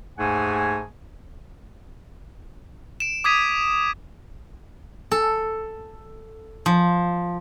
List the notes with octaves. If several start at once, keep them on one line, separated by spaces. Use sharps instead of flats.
D#2 G#2 A3 G#4 F#5 G#5
D7 E7
D6 D#6 G#6 B6 D#7
A4
F3